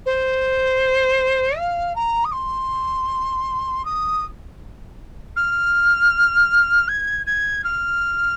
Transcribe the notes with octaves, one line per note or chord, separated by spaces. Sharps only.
C5
F5
A#5
D#6
C6
D#6
F6
G#6
G#6
F6